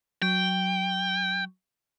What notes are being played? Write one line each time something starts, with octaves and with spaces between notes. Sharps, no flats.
F#3 G5